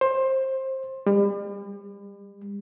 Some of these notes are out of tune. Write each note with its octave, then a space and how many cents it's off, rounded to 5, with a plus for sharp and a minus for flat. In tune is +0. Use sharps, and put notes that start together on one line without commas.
C5 +20
G3 +40